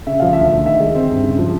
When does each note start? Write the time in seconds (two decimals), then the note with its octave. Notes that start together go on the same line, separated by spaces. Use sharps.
0.07 C#3 E5
0.20 F3 F5
0.33 D2 E5
0.51 D2
0.65 D#3 E5
0.80 G#3
0.95 C4
1.10 G2
1.24 C#3
1.39 F3